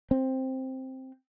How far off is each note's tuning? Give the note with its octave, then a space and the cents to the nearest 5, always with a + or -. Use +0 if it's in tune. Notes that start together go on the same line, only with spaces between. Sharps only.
C4 +5